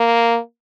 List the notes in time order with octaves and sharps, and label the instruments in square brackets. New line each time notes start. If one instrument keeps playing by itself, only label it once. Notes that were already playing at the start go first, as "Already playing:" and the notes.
Already playing: [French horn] A#3